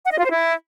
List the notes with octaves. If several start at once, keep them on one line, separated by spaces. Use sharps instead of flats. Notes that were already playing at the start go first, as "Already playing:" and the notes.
F#5
D#5
F4
C5
E4